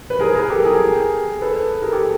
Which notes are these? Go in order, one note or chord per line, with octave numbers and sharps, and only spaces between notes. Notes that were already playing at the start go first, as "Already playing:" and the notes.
B4
G#4 A#4
G#4 A#4
G4 A4
G#4 A#4
A4 B4
G#4 A#4
G4 A4
A#4